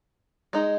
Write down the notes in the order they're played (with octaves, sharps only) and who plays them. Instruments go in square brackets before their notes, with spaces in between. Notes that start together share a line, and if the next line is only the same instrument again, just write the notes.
[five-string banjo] G#3 D#4